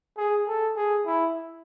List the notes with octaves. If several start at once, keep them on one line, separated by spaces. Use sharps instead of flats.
G#4
A4
G#4
E4